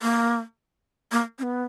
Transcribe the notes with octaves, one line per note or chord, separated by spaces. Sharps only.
A#3
A#3
C#4
B3